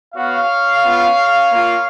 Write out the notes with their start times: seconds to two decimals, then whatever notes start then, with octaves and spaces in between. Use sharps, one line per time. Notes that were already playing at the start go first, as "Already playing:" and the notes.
0.15 B3 F#4 C#5 F5
0.83 B3 F4
1.52 A#3 F4